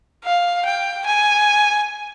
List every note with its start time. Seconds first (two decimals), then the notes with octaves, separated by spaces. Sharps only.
0.24 F5
0.65 G5
1.06 G#5